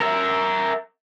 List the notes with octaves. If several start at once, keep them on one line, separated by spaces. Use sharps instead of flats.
A#4 E5